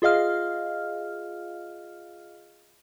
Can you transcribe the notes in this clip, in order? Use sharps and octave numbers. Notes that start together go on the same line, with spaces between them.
F4 G#4 D#5 F5 F6